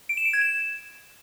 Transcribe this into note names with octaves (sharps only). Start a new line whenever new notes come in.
D7
E7
D7
G#6
E7